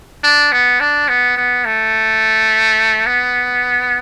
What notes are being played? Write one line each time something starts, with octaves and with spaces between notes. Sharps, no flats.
D4
B3
D4
B3
B3
A3
B3